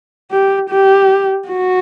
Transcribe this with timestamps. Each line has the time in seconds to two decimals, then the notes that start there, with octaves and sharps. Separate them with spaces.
0.31 G4
0.70 G4
1.49 F#4